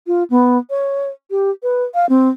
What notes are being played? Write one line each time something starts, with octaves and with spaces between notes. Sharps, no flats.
F4
B3
C#5
G4
B4
F5
C4